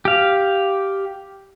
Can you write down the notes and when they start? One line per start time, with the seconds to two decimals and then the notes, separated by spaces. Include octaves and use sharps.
0.05 G4 F5